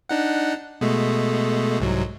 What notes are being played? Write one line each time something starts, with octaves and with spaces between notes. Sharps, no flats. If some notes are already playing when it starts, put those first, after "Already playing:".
D4 D#4 F#5
B2 G#3 A3
C2 G#2 F#3